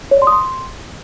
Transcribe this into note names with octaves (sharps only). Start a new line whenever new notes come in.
C#5
D5
C6
D#6
C6